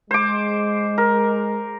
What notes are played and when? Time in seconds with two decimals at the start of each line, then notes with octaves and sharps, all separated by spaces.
0.11 G#3 C5 D6
0.98 A#4